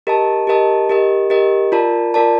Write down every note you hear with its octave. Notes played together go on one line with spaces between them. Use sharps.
G4 A#4 D#5 A5
G4 A#4 D#5 A5
G4 A#4 D#5
G4 A#4 D#5
F4 A#4 D5 A5
F4 A#4 D5 A5